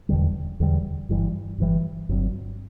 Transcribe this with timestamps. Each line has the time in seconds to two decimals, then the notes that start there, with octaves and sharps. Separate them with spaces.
0.09 E1 E2 D3 G3
0.60 E1 E2 D3 G3
1.09 G1 G2 E3 G3
1.58 G1 G2 E3 G3
2.09 G1 G2 F#3 C4